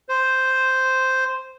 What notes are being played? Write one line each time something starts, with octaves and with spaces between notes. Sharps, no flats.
C5